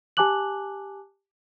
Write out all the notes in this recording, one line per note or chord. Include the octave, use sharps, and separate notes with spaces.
G4 G#5 A5 D6 F#6 F#7